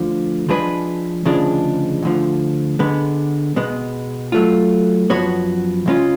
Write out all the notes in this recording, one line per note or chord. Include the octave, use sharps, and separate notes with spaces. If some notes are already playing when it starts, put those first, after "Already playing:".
Already playing: D2 D3 F3
F3 G#3 D4 G#4 B4
D2 C#3 F3 G#3 D4
D2 D3 F3
D3 G#3 B3
B2 G#3 B3
F#3 A3 F4
F#2 F3 B3 F#4 C#5
C#2 C#3 G#3 C#4 F4